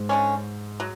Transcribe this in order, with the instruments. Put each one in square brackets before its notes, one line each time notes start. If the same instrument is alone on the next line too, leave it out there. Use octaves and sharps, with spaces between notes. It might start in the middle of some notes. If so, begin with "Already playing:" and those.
Already playing: [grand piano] G#2
[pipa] D3 G#3 C#4
F#3